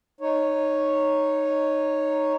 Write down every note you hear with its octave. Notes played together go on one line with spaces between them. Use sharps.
D#4 C#5